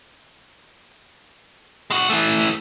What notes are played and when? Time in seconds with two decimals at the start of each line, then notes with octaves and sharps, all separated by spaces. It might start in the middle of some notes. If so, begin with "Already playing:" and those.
1.91 G#3 F#4
2.10 E3 A3